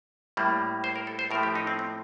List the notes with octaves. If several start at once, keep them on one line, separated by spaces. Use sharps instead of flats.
A2 G3 A#3
C5
A#4
A4
C5
A2 F3 A3 A#4
G4
D#4
C4
C4